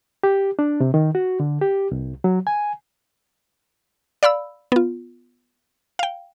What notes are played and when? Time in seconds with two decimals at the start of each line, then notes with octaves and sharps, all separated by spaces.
0.23 G4
0.59 D4
0.80 C3
0.94 D#3
1.15 F#4
1.40 D3
1.61 G4
1.91 C2
2.24 F#3
2.47 G#5
4.23 D5 F5 B5 E6
4.72 B3 F4
5.99 F5 G5